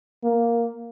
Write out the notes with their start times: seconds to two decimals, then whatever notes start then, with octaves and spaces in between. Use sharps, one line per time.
0.24 A#3